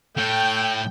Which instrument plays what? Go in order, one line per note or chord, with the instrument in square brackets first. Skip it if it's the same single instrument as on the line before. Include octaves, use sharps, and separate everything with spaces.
[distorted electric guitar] A2 A3 [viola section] G5